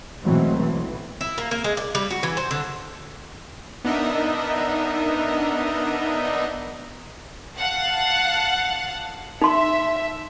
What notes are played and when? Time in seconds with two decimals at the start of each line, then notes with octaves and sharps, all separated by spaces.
0.23 B2 E3 F#3 G#3 A3 C4
0.56 B1 E3
1.21 E4
1.38 A#3
1.51 A#3
1.64 G#3
1.77 D5
1.95 G3
2.10 F#4
2.23 E3
2.37 C5
2.51 D3
3.84 B3 D4 D#4 A#4 D#5 E5
7.58 F5 F#5 A5
9.42 D#4 E5 C6